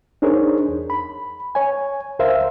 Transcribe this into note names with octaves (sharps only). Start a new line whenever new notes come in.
D4 D#4 G#4 A#4 C5 C#5
E2
B5
C#5 G#5
C#2 A#4 C5 E5 F5